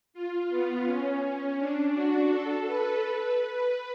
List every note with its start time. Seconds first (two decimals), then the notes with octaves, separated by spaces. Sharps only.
0.14 F4
0.50 B3
0.86 C#4
1.22 C#4
1.58 D4
1.94 F#4
2.30 A4
2.66 B4
3.39 B4